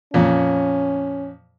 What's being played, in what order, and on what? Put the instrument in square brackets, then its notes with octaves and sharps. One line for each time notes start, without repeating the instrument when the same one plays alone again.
[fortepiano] F2 A#2 [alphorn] C#4